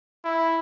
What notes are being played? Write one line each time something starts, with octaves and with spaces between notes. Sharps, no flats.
E4